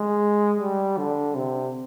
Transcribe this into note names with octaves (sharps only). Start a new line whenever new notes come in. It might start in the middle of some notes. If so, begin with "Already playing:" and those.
Already playing: G#3
G3
D3
C3